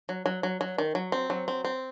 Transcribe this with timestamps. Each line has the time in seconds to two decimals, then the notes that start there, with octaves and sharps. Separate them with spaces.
0.09 F#3
0.26 F#3
0.43 F#3
0.61 F#3
0.78 D#3
0.95 F#3
1.12 C4
1.30 F#3
1.48 C4
1.65 C4